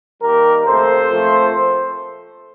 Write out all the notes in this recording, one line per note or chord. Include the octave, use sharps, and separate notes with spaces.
D#3 G3 A#3 G4 A#4
C3 F3 A3 A4 C5
A#2 F3 A3 C4